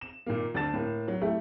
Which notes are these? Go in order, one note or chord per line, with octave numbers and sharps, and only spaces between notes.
E7
A#2 D#3 A#3
D2 D4 A5 A6 E7
A2 A#3
F#3
A3 E4 G4